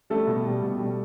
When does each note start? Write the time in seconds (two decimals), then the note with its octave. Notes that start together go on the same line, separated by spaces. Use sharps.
0.10 G3 A3 A4
0.27 B2
0.46 G3
0.62 B2
0.79 G3